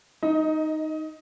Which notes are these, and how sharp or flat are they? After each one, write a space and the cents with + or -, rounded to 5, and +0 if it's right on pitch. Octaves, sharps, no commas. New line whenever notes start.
D#4 +0 D#5 +25